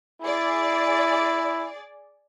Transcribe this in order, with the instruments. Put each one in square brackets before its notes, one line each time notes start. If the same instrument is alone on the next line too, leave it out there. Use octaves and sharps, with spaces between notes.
[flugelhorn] E4 [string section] G#4 D5